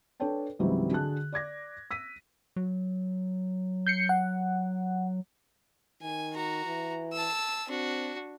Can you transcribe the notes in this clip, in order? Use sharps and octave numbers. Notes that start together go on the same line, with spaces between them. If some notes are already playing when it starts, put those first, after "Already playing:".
D4 A4 B4 C#5 G5 A5
C#2 G#2 E3 F#3 G3 C4
D3 F#4 G#4 A5 F#6
D5 D6 G#6 A#6
E6 B6 D#7
F#3
G6 C7 C#7
F#5
D#3 G#5
F#4 A#5
E3
A5 E6
C4 D4 F#4